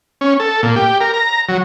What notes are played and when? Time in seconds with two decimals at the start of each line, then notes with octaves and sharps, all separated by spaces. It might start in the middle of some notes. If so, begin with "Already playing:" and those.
0.21 C#4
0.40 A4
0.63 A#2
0.76 G4
1.01 A#4
1.14 A#5
1.49 F#3